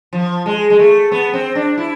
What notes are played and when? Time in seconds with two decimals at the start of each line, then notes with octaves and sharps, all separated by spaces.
0.13 F3
0.46 G#3
0.70 G#3
0.79 A3
1.12 B3
1.34 C4
1.55 D4
1.78 E4